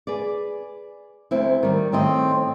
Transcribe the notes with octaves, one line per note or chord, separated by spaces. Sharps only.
G#4 B4 D5
D2 C4 E4
D#3 G3
A2 D#3 C4 D#5